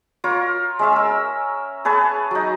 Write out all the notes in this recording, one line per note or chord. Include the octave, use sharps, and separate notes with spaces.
F4 A#4 C#5
G#3 C#4 E5 F5
A#4 E6
G#4 B4 C#5 A5
F#3 D#4